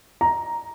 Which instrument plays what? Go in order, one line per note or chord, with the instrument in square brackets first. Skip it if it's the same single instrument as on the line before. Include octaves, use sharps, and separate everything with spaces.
[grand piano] A#5